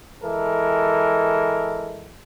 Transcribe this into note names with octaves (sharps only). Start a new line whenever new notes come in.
E3 G#3 A4 A#4